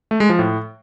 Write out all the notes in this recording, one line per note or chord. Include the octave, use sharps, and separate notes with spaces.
A3
G#3
F3
A2